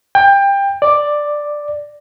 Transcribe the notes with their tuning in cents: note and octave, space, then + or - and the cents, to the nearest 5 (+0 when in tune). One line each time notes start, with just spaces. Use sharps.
G5 +20
D5 +5